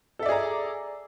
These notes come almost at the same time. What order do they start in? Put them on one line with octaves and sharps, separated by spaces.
A4 E5 D5 G#4 A#5